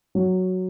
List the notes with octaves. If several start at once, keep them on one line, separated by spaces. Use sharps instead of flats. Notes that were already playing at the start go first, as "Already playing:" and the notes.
F#3